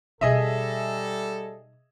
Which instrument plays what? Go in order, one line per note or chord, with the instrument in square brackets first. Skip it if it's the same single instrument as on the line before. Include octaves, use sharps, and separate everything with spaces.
[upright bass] B2 D#4 [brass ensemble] G3 A4 [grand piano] G#4 D#5 E5